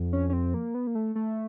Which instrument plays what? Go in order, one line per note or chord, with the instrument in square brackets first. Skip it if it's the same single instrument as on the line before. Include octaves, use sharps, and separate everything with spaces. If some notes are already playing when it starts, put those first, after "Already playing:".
Already playing: [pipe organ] F2
[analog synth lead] C#4
C#4
C4
A#3
B3
A#3
A3
A3